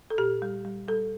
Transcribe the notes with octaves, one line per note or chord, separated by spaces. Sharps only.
A4
A#2 G4
G3
G3
G3 A4